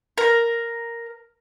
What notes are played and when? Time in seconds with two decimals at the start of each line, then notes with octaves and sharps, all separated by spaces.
0.18 A#4